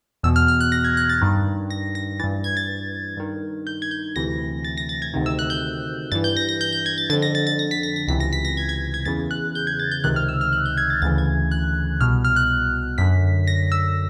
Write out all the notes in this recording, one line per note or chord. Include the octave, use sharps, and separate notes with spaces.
E2 B2 E6
F6
F6
F#6
A#6
G#6
F#6
A6
G2 D#3
A#6
A#6
G2 E3 A6
G#6
A6
G2 D#3
G6
G#6
G6
D2 C3 E3 A#6
A6
A#6
A6
G#6
D2 C3 D#3
E6
F#6
G6
G2 E3 A6
G6
A#6
A#6
G6
G6
G#6
A6
F2 D3 A6
A#6
A6
A6
A#6
B6
A#6
A#6
C#2 C3 E3 B6
A#6
B6
A#6
G#6
G#6
G#6
E2 C#3 E3 A6
F#6
G6
G#6
A6
G6
C#2 C3 D#3 F#6
F6
E6
F6
F#6
G6
G#6
A6
D2 C#3 E3 A6
G#6
F#6
C2 B2 F6
F6
F#6
F#2 D3 B6
A#6
E6